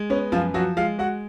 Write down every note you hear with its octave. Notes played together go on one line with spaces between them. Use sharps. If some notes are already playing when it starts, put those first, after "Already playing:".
Already playing: G#3
B3 C#4
F#2 F3 F4
F3 F#3 F#4
G#3 F4 F5
G#3 F#4 F#5